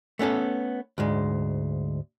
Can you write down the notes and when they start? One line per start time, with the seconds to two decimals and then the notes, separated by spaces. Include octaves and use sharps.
0.19 A3 B3 C#4 A4
0.98 D2 G#2 G#3